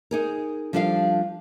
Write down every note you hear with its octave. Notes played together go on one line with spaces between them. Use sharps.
D#4 G#4 A#4
F3 G3 D4 A4 E5 F5